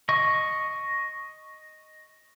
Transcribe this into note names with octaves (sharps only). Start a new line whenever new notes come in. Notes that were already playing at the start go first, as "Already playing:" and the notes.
D#5 C#6